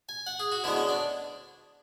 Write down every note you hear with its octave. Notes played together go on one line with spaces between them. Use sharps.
G#5
F#5
G#4
F#4
D2 D3 G#3 B3 E4
C#4
D4